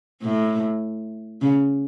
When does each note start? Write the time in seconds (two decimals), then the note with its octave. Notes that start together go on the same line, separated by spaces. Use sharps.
0.23 A2
1.42 C#3